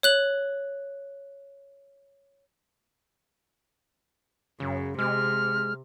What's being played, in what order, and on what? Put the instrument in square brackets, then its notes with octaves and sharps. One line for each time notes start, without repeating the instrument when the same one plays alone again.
[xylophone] C#5 F#6 F#7
[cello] F#2 [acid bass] C#3
[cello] C3 [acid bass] G#3 [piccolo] F6